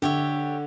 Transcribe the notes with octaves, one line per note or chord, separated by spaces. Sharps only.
D3 G4 C#5 E5